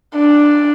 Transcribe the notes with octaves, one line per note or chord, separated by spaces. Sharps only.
D4